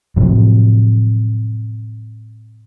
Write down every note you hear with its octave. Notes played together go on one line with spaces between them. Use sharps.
A2 C3 F3 F#3